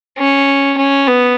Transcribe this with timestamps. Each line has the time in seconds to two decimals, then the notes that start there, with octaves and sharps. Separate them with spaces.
0.18 C#4
0.77 C#4
1.08 B3